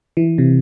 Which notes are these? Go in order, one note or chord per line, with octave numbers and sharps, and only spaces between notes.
E3
C3